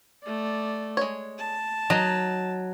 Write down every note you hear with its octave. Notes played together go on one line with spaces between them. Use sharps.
A3 D5
G#3 C#5
A5
F#3 D#4 D#5